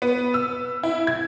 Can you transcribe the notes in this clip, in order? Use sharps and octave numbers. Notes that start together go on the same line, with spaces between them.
B3
E6
E4
G#6